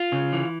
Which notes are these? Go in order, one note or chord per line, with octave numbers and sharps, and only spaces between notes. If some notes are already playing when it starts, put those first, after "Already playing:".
Already playing: F4
C#3
E3